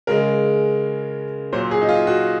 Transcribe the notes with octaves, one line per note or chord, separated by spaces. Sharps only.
C#3 G#3 A#4
A#2 F#3 C5
G#4
D#4
F4
F#4